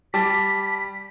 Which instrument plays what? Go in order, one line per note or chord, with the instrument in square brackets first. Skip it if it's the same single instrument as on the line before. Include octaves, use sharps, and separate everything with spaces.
[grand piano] G3 [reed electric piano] A5 D6 [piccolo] B6